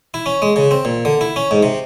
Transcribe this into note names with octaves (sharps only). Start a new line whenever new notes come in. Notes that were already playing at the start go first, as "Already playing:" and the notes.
E4
C#4
G#3
C#3
C4
A#2
D3
E4
C#4
G#2
C3